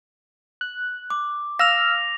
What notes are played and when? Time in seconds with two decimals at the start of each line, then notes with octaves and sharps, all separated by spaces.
0.61 F#6
1.10 D6
1.59 F5 E6 F6 A#6 F7